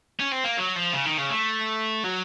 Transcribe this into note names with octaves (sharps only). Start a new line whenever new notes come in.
C#4
C4
A#3
F#3
F3
C#3
D#3
C#3
A3
F#3